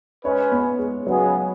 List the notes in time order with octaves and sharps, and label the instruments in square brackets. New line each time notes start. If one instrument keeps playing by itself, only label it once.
[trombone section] G#3 C#4 G#4 B4 [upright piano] C#5
[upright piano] B3
G#3
[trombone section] C#3 G#3 B3 G#4 [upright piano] F#3